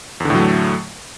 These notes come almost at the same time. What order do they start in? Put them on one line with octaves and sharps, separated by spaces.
E2 D3 A2 F#3 A3